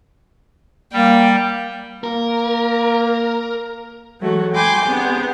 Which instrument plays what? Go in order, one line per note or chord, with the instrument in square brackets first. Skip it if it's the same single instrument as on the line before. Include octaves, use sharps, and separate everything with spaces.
[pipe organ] G3 [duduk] A#3 [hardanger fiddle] G5
[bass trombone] A#3 [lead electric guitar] A#4
[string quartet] E3 F#3 G#3 A3 F#4
G5 G#5 B5 C6 D6 G6
B3 C4 D4 G4 G#4